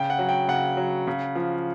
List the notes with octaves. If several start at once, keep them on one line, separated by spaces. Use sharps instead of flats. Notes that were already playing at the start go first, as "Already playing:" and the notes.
Already playing: C#3 G5
F#5
F#3
G5
C#3 F#5
F#3
C#3
F3